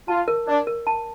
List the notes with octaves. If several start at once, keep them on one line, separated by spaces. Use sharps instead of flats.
F4 A5
A#4
D4 D5
A#4
A5